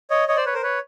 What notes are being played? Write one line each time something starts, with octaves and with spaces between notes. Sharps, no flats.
C#5 D#5
C#5 D#5
C5 D5
B4 C#5
A#4 C5
B4 C#5